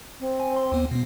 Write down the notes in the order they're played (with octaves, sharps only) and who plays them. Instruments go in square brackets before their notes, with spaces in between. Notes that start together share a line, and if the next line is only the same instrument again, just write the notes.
[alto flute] C4
[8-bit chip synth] G#5
C6
D#2 B3
B2 B3